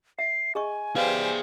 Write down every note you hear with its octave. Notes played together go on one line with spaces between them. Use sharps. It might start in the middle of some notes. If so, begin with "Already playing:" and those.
E5 C7
G#4 D#5 G#5 C#6
G4 G#4 B4 C5 D5 F5